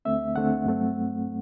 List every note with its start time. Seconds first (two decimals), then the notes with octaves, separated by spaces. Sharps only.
0.05 D2 D3 A3 C4 E5
0.35 D2 D3 A3 C4 F#5
0.66 G2 F#3 A3 C4